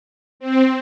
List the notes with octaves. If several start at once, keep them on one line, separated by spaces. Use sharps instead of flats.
C4